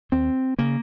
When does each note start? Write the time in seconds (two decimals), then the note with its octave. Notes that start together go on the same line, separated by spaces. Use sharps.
0.12 D#2 C4
0.59 C#3 A#3